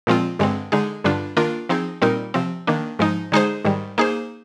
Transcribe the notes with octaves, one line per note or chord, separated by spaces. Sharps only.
A#2 F3 G#3 C4 F4
G2 D3 G#3 C4
D3 G#3 D#4 G#4
G2 D3 G3 D4 F4
D#3 A#3 D4 F4 A#4
F3 C4 D#4 G#4
A#2 G3 C4 D#4 A#4
C3 F3 C4
D#3 A#3 D4
G#2 F3 G#3 D#4
D3 G#3 D#4 G#4 C5
G#2 D#3 G3
A#3 D#4 G#4 C5